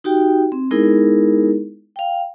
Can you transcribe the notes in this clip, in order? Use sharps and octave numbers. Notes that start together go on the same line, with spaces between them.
D#4 F#4 G4 G5
C4
G#3 B3 D#4 E4 G#4 A#4
F5 G5